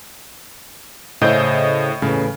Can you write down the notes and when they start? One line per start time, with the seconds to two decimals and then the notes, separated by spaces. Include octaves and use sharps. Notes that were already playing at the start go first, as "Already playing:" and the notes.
1.21 A2 C#3 C5 D#5 E5 G6
2.02 E2 A2 C#3